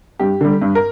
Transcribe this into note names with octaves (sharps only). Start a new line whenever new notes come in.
G2 G4
D3 G3
G2
A#4